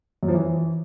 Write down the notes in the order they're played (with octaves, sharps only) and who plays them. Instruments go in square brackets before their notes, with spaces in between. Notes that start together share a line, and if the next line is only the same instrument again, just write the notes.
[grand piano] F#2
F3
E3